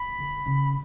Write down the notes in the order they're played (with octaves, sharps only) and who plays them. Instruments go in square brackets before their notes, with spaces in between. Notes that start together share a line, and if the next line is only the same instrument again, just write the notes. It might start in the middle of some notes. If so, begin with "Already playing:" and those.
Already playing: [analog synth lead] B5
[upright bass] D3
C#3